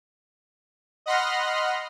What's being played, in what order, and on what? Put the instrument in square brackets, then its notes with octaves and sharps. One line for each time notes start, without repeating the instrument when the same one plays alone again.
[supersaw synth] D#5 F#5 B5 C6 F6 A#6